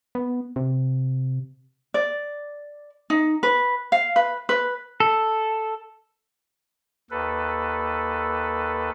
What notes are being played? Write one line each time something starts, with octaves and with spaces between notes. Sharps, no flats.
B3
C3
D5
D#4
B4
F5
B4
B4
A4
D#2 A4 B4